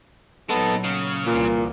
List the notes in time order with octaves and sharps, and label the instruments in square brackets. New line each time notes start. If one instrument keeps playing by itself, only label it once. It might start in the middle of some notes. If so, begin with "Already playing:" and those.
[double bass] A#2 F#3 [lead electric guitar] G#3 D#4 [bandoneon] B3 A4
[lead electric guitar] C#3 [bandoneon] F6
[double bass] C2 E3 [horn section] A#2